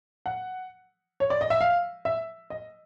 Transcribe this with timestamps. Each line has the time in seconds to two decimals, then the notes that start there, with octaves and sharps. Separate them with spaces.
0.26 F#5
1.20 C#5
1.30 D5
1.41 D#5
1.50 E5
1.61 F5
2.05 E5
2.50 D#5